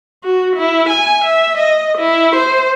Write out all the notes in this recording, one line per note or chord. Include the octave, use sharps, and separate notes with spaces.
F#4
E4
G#5
E5
D#5
E4
C5